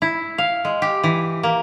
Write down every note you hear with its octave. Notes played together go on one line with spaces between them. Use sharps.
E4
F5
G#3
G4
E3
A#3